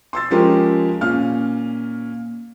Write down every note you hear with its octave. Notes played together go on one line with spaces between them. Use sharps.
C6 E6 A6
F3 G#3 C#4 F4 G4 A#4
A#2 C#4 F5 F6